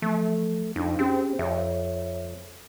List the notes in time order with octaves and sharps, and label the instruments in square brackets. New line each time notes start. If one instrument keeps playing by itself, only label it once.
[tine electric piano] F3 [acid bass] A3
[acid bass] F2 [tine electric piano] D4 D#4
[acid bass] C4 [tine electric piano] C#4 G4 G#4
[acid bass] F2 [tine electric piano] C#5 E5